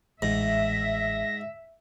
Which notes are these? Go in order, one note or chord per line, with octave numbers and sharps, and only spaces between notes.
A1 G#2 E5 A#6